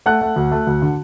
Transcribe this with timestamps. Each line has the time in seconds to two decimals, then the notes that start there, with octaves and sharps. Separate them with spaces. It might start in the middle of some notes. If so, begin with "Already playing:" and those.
0.06 A3 F#5 F#6
0.21 A3
0.36 D2
0.51 A3
0.67 D2
0.82 D3